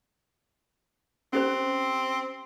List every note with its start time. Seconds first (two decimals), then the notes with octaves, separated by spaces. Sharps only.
1.33 C4 C#4 G4 C5